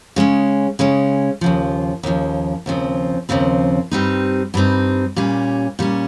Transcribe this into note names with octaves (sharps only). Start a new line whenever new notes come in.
C#3 G#3 C#4
C#3 G#3 C#4
D#2 C#3 F3
D#2 C#3 F3
D#2 C#3 F3 C4
D#2 C#3 F3 C4
G2 G3 C4 D#4
G2 G3 C4 D#4
A#2 G3 C#4
A#2 G3 C#4